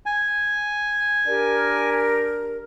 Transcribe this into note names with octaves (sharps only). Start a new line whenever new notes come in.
G#5
D4 G4 A#4